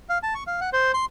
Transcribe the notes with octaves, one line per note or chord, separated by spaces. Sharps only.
F5
A5
C#6
F5
F#5
C5
C6